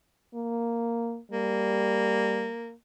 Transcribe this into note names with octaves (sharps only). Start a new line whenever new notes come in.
A#3
G3 A#3